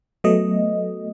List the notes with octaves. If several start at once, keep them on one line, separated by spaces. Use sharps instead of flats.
F#3 A3 B3 D#5